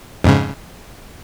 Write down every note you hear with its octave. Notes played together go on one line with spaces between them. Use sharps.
F2 G#2 C#3